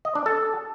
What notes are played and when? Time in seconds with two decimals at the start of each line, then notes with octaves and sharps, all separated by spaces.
0.05 D#5
0.15 D4
0.26 A4